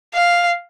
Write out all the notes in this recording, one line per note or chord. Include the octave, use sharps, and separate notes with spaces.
F5